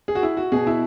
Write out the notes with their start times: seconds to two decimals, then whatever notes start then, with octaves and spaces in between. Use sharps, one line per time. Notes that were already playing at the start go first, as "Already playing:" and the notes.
0.08 G#4
0.15 F#4
0.23 E4
0.37 F#4
0.52 B2 G#4
0.67 E4